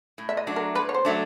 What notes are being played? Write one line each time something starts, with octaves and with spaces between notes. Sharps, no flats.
A2
E5
D#5
F#3 A3 D4
A#4
A2 B4
C#5
C5
F#3 A3 D4